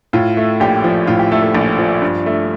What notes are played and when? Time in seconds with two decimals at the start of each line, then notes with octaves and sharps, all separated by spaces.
0.13 A2 F4
0.37 A3
0.60 A#1 G4
0.84 F3
1.07 A2 F4
1.19 G4
1.32 A3 A4
1.43 A4
1.55 A#1
1.79 F3
2.02 G2
2.26 A3